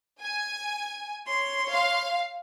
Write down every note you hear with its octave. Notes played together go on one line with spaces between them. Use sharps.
G#5
C#5 C6
F5